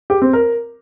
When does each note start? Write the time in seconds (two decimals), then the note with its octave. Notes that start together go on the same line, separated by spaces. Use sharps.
0.10 G4
0.22 C4
0.33 A#4